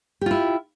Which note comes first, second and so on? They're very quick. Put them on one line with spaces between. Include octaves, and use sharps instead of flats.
G4 F4 E4